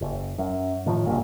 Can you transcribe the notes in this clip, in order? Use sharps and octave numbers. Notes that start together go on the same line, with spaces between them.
F#1
F#2
A2 D#3 F3
F#1 C2 G2 A#2